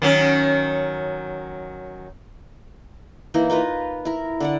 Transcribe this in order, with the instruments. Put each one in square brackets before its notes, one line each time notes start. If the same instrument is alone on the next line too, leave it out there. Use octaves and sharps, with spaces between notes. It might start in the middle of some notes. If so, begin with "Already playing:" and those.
[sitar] D#3 F#3 C#4
[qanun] E3 A#3 D#4 E4
D#4 F4 A#4 B4
E4 A#4
D3 D5 F#5